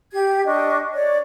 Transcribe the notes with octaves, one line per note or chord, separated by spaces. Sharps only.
G4 G#6
D4 D#5 C#6
C#5 D5